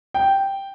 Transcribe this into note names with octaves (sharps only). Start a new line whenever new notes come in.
G5